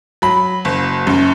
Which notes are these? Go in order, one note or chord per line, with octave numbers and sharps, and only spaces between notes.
F#3 B5
F#1
F#2